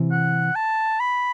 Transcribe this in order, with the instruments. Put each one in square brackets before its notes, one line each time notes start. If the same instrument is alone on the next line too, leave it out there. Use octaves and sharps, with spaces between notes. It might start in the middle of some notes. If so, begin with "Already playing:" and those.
Already playing: [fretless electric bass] C3 E3
[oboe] F#5
A5
B5